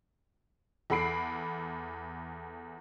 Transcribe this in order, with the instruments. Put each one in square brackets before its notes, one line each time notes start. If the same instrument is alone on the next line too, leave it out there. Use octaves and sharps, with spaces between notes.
[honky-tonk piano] E2 A4 F#5 B5 C7 D7